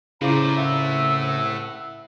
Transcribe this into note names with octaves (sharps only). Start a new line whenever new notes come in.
A2 C#3 E4 F4 C5 D5 A#5 D6
C2 E5 F#5 E6